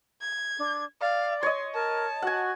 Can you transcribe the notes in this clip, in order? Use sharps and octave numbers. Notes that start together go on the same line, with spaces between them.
G#6
D4
D5 F5
C#5 D#5 C6
A#4 A5
F#4 F#5 G#5